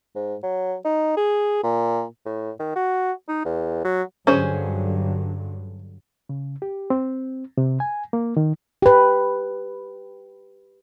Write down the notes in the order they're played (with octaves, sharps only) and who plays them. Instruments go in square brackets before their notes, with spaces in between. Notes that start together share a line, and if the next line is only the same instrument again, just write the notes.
[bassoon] G#2
F#3
D#4
G#4
A#2
A2
D#3
F#4
D#4
E2
F#3
[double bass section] G2 D3 F#3 [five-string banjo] C#4 G#4 C5
[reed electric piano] C#3
G4
C4
C3
G#5
A#3
D#3
[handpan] G4 B4